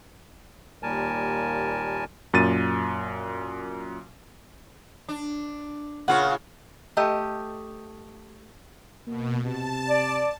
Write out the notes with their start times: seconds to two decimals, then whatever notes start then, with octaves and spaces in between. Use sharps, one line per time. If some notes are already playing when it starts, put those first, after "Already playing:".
0.83 D#2 A#2 G3 A#4 G#5 A5
2.34 F#2 A#2 A6 D#7
5.09 D4
6.08 A#2 C#3 F4 C#5 F5 F#5
6.97 A3 G4 D#5
9.07 B2 A#3
9.44 C3 A5
9.88 D5